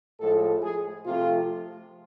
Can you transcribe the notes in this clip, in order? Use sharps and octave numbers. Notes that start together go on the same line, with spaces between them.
A2 F3 G#3 A4
G#4
C3 F3 A3 F4